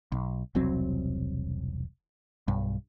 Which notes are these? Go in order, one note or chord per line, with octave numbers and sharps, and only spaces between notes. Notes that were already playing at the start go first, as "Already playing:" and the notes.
B1
E1 C2 F#3 C4
B1 G2